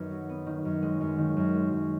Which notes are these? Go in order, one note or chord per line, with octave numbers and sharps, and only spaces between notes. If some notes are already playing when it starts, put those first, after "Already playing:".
Already playing: F#2 D#3 B3
F#3
B3
D#3
F#2
G#3
F#2
D#3
F#2
G#3
F#2